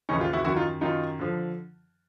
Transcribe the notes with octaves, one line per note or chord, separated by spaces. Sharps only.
D#2 C#3 E3 C#4 D#4
F4 G4
E4 F#4
F#2 D#3 E4 F#4
D#4 F4
F#2 D#3 D#4 F4
D3 F3